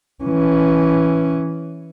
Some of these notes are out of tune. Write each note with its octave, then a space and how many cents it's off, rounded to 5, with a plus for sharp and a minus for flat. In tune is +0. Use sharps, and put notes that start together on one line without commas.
E3 +0 C#4 +0